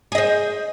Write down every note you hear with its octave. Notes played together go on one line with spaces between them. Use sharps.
G#4 C5 D#5